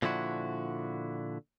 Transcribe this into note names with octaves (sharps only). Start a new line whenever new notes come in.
A#2 D3 F3 E4 F#4